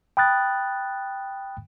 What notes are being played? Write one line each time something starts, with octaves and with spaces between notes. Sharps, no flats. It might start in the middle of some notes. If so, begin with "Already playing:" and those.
G5 B5 D#6 F#6 A6